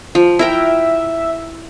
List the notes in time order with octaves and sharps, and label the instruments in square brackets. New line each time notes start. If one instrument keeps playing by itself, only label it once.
[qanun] F3
[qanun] E4 A#4 G5 [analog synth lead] E5